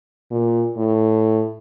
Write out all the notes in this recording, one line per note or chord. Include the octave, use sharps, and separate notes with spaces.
A#2
A2